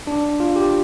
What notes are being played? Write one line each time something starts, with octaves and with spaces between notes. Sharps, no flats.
D4
F4
G4